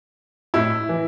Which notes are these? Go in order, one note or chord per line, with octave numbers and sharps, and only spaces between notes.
A2 E4
E3